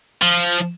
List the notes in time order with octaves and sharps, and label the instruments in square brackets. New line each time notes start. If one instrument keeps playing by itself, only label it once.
[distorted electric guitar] F3